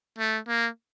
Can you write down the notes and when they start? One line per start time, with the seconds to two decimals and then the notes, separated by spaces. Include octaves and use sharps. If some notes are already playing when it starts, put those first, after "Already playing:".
0.18 A3
0.48 A#3